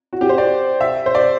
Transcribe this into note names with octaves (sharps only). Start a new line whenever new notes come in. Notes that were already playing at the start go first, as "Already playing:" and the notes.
F#4
G4
C5
D5
E5
C5
D5